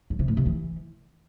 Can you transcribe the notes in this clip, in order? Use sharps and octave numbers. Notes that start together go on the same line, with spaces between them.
G2
C3
A2
C3
E3